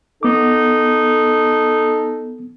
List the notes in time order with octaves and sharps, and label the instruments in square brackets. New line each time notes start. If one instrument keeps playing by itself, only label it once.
[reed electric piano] B3 D6 [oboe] D#4 [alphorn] A4